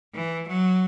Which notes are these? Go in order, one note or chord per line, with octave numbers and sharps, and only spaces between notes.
E3
F#3